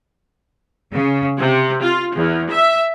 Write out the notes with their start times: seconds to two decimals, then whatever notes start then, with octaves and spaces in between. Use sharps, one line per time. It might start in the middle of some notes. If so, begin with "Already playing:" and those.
0.92 C#3
1.39 C3
1.82 F4
2.16 E2
2.51 E5